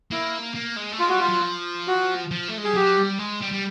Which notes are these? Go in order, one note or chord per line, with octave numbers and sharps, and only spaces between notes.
A#3 E4
A#3
G#3
A3
G#3 F4
F#4
G3
F4
F#3
F3
F#4
F3
A3
G#3
G3 G#4
F#3 G4
G3
G#3
G3
G3